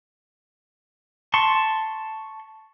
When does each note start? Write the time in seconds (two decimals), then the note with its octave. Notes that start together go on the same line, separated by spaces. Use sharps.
1.34 A5 C6 C#6